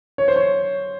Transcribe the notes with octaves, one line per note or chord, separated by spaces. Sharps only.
C#5
C5
C#5